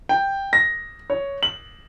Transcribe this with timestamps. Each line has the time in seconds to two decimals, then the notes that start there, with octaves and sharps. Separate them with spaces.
0.09 G5
0.53 A#6
1.10 C#5
1.43 F#7